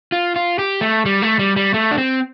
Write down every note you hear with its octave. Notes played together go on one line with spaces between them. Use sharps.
F4
F4
G4
A3
G3
A3
G3
G3
A3
D4
C4